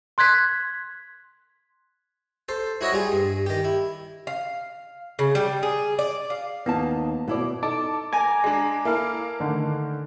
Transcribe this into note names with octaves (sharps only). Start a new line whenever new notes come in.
C6 F#6 G#6 B6
A4 C5
E4 F#4 C#5 D#5 E5
G3 F4 G#4
G2
D#3 G4
E4
F5
C#3
G3
G#4
D5
F5
D#2 B3 D#4 A5
B2 E4 D5
D#4 A4 A5 D6
G#5 A#5 D6
G#3 D4
A#3 E4 A4 F5
D3 D#3 A3